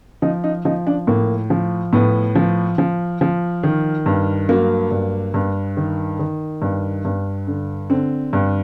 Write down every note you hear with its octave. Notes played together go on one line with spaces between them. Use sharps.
F3 D#4
D#4
F3 D#4
D4
A2 A#3
F3
A2 B3
F3
F3
F3
D#3
G2
F#3 A#3
G2
G2
D#3
D#3
G2
G2
D3
D3 C4
G2